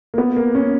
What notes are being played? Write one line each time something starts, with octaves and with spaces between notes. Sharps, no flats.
A#3
B3
A#3
C#4